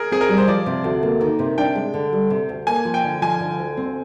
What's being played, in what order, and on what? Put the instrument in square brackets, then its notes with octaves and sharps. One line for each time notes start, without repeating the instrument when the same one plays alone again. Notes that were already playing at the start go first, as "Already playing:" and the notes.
Already playing: [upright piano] G#4 A#4
[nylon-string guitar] C4 [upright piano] G#4
[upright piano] A#4
[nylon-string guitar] G3
[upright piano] C5
[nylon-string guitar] F3 [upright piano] D5
[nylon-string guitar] C3
D2
A#3
D#3
C3
[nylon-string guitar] D4 [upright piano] G5
[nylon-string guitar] G#3
D3
G3
C3
D2
[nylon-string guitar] A#3 [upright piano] G#5
[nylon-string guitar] F3
[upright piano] G5
[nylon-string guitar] D3
[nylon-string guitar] F3 [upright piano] G#5
[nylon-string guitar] D3
D2
C4